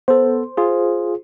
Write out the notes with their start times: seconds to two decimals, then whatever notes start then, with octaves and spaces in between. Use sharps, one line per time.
0.08 B3 A4 C5
0.57 F4 G#4